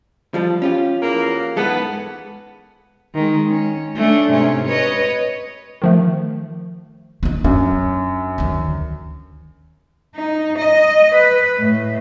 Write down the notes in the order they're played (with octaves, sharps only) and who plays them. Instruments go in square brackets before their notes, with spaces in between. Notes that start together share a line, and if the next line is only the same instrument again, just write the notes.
[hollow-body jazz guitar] F3 G3 A4
C#4 F4 G4
[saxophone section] E2 A#3
[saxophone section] G#2 E3 B3 [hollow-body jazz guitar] G#3 A4
[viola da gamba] D#3 G#3
C#4
A3 C#4 D4
G#2 C3 C#4
B4 C#5 D#5
[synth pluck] D#3 F3 A3
[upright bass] A#3 D4
[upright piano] F#2 [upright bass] D4
[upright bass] D2 D#3
[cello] D#4
D#5
B4
A2